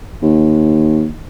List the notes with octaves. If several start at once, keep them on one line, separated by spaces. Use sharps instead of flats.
D#2